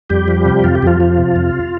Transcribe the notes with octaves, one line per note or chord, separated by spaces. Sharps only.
F2 G3 G4
F3
C3
F2 F4
G4
F2 F3 F4
F3
C3
F2